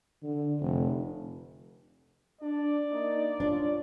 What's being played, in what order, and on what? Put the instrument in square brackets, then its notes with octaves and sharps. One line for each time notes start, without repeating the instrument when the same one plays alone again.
[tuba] D3
F1
[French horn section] D4 [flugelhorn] D5
[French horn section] A#3 D#4
[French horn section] C#4 F4 [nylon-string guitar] D4